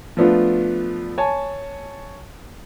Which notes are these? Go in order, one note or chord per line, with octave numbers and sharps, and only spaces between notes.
F3 A3 B3 D4 F4
C#5 G#5 A5